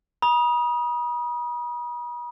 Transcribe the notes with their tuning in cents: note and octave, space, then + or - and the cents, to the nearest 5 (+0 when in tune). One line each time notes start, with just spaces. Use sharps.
B5 -45 D#6 +0